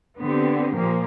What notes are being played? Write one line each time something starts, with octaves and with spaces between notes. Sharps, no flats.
D3 B3 C4 G4
A#2 F3 A#3